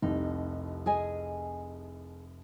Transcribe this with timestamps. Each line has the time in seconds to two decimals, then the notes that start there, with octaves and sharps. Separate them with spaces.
0.02 F1 C2 D#4
0.86 G#4 D#5 G#5